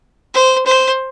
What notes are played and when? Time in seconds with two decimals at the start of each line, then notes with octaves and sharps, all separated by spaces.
0.34 C5
0.66 C5